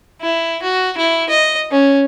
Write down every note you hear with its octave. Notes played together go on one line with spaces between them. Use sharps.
E4
F#4
E4
D#5
C#4